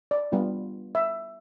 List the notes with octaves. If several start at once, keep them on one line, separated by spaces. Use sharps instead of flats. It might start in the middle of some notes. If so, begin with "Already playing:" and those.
D5
G3 B3 D4 F4
E5